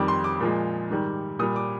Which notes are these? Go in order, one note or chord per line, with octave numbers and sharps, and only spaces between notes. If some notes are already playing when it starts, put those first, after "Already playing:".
Already playing: F2 D#3 G3 D6
C6
D6
A#2 F3 G#3
G#2 D#3 G3
A#2 G3 D#6
D6